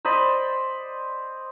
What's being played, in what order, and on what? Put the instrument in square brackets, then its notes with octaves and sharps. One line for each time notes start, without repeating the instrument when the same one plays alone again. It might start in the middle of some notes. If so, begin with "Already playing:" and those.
[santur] C5 D5 D#5 B5